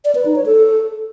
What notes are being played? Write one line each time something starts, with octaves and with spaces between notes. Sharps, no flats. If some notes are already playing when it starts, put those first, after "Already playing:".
D5
B4
D#4
C#5
A4